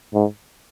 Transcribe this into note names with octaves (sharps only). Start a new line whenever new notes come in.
G#2